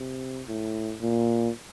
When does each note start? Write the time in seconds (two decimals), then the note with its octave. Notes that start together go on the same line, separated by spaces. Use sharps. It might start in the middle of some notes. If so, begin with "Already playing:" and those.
Already playing: C3
0.47 A2
1.01 A#2